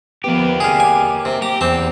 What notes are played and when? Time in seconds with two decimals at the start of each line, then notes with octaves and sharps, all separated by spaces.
0.24 F3 A#3 B3 G4 B4
0.60 C3 G#4 D5 F5 D#7
0.80 G#5 D6
1.25 C3
1.42 G4 A#5
1.61 E2 C4 A5